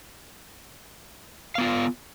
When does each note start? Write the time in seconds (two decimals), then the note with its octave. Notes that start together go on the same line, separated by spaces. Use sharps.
1.55 F5
1.58 B3
1.61 F4